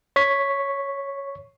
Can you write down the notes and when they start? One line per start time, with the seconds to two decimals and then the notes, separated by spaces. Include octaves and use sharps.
0.16 C#5 C#6 B6